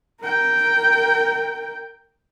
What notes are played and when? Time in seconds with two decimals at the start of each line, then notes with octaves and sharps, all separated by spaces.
0.21 A#4 G5